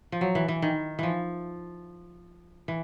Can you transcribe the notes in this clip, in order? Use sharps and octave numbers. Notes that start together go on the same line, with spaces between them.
F3
F#3
E3
E3
D#3
E3 F3
E3